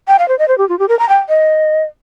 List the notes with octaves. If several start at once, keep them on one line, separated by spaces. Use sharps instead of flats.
G5
F5
C5
D#5
C5
G4
F4
G4
A#4
A#5
G5
D#5